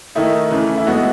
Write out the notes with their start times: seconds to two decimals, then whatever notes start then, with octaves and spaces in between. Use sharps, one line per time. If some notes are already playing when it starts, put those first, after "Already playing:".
0.15 D#3 A3 D#4 E4
0.51 C#3 E3 A3
0.77 E4
0.86 E3 G#3 B3 D#4 F#4